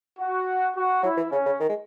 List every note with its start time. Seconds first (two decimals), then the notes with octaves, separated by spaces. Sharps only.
0.19 F#4
0.75 F#4
1.03 F#3 E4
1.17 E3
1.31 C#3 C#4
1.46 C#3
1.60 D#3
1.69 G#3